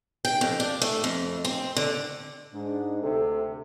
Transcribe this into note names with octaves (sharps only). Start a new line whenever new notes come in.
G5
F2
D4
A3
F2
C4
D3
G#2 D4
D2 C3 A4